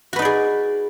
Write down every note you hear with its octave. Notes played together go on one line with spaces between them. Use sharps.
D#4 F#4 G#4 B4 D5